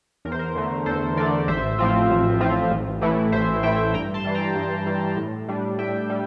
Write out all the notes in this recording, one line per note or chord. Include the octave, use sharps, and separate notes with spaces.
E2 A#4
C5
A#4
D3 A3
E2 A4 C5
D3 A3 A#4 D5
A1 C5 E5
A2 F3 C4 F4
A1
A2 F3 C4 F4
A1
A2 E3 A3 E4
A1 C5 E5
A2 E3 A3 E4 E5 G5
G2 G5 A#5
A5 C6
E3 G3
G5 A#5
G2
E3 G3
A2
G3 D4
A2 E5 G5
G3